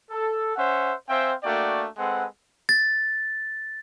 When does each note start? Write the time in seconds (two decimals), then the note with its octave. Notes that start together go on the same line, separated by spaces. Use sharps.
0.11 A4
0.56 C#4 C5 E5 F#5
1.09 C4 C5 E5 F5 G5 G#5
1.44 A3 A#3 D4 F#4 D5 G5
1.97 G#3 C4 A4 B4 F#5
2.69 A6